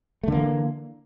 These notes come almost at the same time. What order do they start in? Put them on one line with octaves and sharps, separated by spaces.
A3 D3 A#3 E3